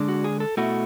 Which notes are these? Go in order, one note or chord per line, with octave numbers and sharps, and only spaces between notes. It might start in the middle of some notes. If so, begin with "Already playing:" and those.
Already playing: D3 G#3 D4
F#4
G#4
A4
B2 A3 E4 F#4